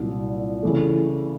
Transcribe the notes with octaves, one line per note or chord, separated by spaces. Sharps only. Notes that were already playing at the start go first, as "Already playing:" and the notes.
Already playing: C2 A#2 F#3
C#3 E3 A3